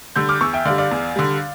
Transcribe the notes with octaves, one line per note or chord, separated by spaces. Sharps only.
D3 G3 E6 G6
D6 F6
E2 C#6 E6
E5 G5
D3 G3 D5 F5
D5 F5
E2
D3 G3